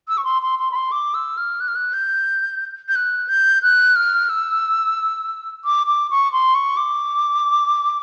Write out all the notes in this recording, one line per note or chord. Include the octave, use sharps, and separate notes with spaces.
E6
C#6
C6
C6
C6
B5
C6
D6
E6
F6
F#6
F6
F#6
G6
G6
F#6
G6
F#6
F6
E6
D6
D6
C#6
C6
C#6
D6